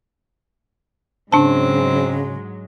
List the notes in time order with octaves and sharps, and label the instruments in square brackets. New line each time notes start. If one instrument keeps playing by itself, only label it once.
[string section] G#2 F#3 G#3 [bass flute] C#3 [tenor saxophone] C4 [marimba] D4 A5